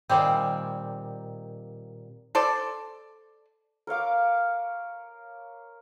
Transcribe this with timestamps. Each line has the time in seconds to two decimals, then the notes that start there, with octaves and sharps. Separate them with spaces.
0.09 A#2 D#3 G3 C4
2.35 A4 C5 D5
3.87 A#4 C#5 F5 D6